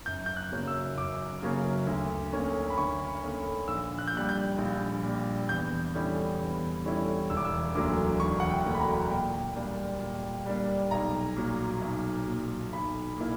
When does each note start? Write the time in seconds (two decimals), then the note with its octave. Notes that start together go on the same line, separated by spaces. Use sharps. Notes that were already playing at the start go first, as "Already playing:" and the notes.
0.06 F#2 G6
0.26 G6
0.37 F#6
0.52 C#3 F#3 A#3 C#4
0.68 E6
0.97 F#2 D6
1.43 C#3 F#3 A#3 C#4
1.87 D2
2.33 D3 A#3 C#4
2.70 B5
2.78 D2 C#6
3.24 D3 A#3 C#4
3.68 A#1 E6
3.99 F#6
4.08 G6
4.13 A#2 G3 F#6
4.29 G6
4.58 A#1
5.03 A#2 G3
5.49 E2 G6
5.94 D3 G3 C#4 E4
6.40 E2
6.85 D3 G3 C#4 E4
7.30 E1 E6
7.37 D6
7.45 E6
7.75 D2 D3 F#3 A#3 D6
8.20 E1 C#6
8.40 F#5
8.50 G5
8.65 D2 D3 F#3 A#3
8.75 B5
8.80 A#5
9.11 A#2 G5
9.56 G3 A#3 D4
10.01 A#2
10.46 G3 A#3 D4
10.91 B1 A#5
11.37 A#2 F#3
11.81 B1
12.27 A#2 F#3
12.73 B1 B5
13.18 A#2 A#3 E4